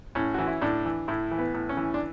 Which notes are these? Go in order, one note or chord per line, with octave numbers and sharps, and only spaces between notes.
A2 C#4
E3 F#4
E4
A2 D4
E3
A2 E4
E3
B3
A2
C#4
E3
D4